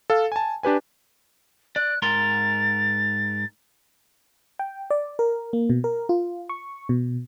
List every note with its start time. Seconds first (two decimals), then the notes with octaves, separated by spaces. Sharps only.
0.10 A4 F5
0.32 G#5 A5
0.63 D4 G4 B4 G#5
1.76 D5 F#6
2.02 G#2 A#4 C6 A6
4.59 G5
4.91 D5
5.19 A#4
5.53 A#3
5.70 B2
5.84 A#4
6.09 F4
6.49 C#6
6.89 B2